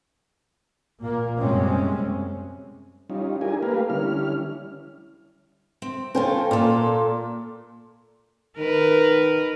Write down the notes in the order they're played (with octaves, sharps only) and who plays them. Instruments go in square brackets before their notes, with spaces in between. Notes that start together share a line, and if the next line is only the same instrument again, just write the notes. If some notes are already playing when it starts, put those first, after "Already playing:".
[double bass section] A#2 A#3
F#2 C3 G3 G#3 C4 C#4
[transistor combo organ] G3 C#4 D#4 F4
D4 E4 G4 G#4 A#4 G#5
A3 A#3 G4 A#4 B4 F5
D3 G3 C#4 E4 F6
[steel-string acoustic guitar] C4
[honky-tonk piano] C#4 C5 G5 [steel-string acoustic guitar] F4 A4 A#4
[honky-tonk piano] A#2 [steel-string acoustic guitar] F4 A4
[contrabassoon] D#3 [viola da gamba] A#4 B4